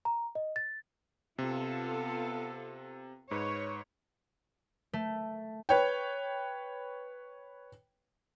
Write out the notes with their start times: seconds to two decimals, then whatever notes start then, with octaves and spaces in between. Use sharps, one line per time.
0.05 A#5
0.35 D#5
0.56 A6
1.39 C3 B3 F4 A4
3.31 G#2 B4 C#5
4.93 A3
5.69 B4 C#5 G5